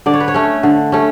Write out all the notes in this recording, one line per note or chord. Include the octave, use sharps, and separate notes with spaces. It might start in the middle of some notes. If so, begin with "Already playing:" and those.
D3 D5
C#5
B4
C#5
A3 C#4
D3
A3 C#4